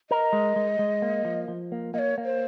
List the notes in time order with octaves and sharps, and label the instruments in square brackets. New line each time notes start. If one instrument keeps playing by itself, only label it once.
[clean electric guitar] A#4 [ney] D#5
[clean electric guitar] G#3
G#3
G#3
A#3
F3
F3
A#3
[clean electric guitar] A#3 [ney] D#5
[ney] C#5
[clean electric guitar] A#3
[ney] C5